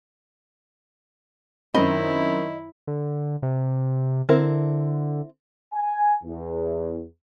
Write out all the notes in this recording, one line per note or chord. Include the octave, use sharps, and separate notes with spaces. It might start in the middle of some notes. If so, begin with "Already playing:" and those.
F#2 D#3 C4 E4 D#5 B5
D3
C3
D3 C4 E4 A#4
G#5
E2